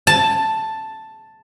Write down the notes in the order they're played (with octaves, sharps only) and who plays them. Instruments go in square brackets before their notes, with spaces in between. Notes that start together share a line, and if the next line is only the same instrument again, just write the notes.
[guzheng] A5